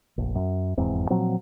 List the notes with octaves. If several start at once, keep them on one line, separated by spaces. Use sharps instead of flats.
F1 A#1
F#2
F1 E2 G#2 C4
A#2 F3 F#3 C4